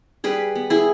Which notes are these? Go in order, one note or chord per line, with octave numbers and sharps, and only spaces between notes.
G3 G#4 B4
B3
E4 G#4